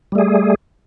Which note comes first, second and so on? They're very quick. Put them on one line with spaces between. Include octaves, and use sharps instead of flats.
G3 A3 G#4